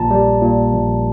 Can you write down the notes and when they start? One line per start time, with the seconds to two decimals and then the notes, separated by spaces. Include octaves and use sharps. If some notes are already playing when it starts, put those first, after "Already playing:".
Already playing: A#1 A#2 A5 A#5
0.11 G3
0.41 A#2
0.72 A#1